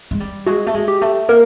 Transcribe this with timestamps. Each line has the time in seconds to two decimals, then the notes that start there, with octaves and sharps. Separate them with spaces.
0.11 G#3
0.20 G3
0.47 G#3 F#4
0.67 A3
0.74 G#3
0.88 G4
1.01 A3
1.29 A#3 A#4